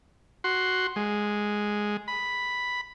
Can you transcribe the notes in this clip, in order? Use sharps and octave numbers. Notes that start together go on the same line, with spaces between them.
F#4 C6
G#3
B5